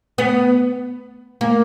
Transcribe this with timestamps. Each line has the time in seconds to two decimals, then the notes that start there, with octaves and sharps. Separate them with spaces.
0.18 B3
1.41 A#3